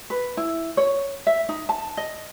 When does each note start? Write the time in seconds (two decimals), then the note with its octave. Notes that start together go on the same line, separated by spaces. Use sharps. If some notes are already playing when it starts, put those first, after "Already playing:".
0.10 B4
0.37 E4
0.77 C#5
1.27 E5
1.49 D#4
1.69 A5
1.97 D#5